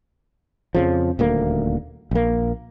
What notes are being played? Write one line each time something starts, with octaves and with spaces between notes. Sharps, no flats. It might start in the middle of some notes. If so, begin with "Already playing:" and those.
F2 C#3 F3
D#1 D2 A#3
A#1 A#3